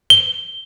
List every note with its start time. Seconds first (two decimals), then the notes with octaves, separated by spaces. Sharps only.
0.10 G7